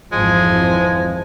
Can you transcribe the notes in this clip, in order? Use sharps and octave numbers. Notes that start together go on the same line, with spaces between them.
G#1 F2 E3 F3 G#3